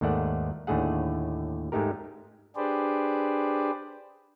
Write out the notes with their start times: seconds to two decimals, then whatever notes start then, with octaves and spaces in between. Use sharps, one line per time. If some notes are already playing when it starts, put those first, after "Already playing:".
0.01 D#2 G#2 D#3 A3 D5 F#5
0.67 D#2 A2 D3 A3 G#4 F#5
1.72 G#2 G#3 A3 D#4 G4 A#4
2.56 D4 G4 G#4 B4 C5 D5